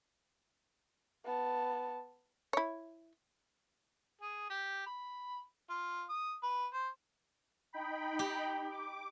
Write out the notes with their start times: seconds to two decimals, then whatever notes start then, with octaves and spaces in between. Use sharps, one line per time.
1.25 B3 A5
2.53 E4 C#5
4.21 G#4
4.50 G4
4.86 B5
5.70 F4
6.09 D#6
6.43 B4
6.74 C5
7.73 D#4 G5 B5
8.19 G4
8.70 D6